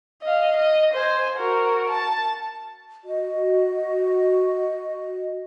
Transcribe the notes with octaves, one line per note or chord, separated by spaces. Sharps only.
D#5 F5
D#5
C5 G#5
F#4 A#4
A5
F#4 D#5